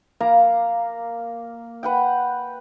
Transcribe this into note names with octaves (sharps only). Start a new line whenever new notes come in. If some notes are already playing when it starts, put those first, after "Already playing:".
A#3 F5 A#5
B4 F#5 G5